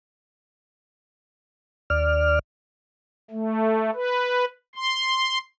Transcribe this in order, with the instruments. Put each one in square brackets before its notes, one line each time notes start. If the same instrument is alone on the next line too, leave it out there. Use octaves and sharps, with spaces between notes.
[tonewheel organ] D#2 D5 F6
[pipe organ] A3
B4
C6